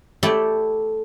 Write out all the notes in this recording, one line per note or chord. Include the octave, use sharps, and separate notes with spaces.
A3 E4 G4 A4 D5 G5